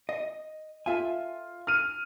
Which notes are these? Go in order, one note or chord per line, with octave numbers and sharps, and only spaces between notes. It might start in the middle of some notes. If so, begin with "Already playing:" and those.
D#5
F4 A4 E5 G#5
F6 D#7